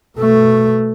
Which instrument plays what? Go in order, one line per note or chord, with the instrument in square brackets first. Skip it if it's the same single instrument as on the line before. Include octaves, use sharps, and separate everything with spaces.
[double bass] B2 A3